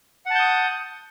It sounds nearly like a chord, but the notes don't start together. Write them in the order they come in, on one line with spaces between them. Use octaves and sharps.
F#5 A5 G6 D#6